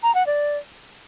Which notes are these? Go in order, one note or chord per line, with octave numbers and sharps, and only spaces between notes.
A#5
F#5
D5